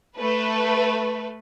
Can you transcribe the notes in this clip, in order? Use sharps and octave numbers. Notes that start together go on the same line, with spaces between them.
A3 B4